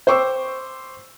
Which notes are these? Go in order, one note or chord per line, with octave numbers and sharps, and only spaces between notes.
C5 G5 C#6 D6 E6